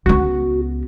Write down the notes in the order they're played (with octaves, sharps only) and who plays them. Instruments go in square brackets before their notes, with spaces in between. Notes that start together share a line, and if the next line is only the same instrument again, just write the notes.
[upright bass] C#2 B3 [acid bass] F#4